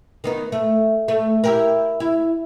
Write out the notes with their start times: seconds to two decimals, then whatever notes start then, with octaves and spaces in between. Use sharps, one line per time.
0.24 D#3 B3 D#4
0.52 A3
1.08 A3
1.44 E4 G4 A#4
2.00 E4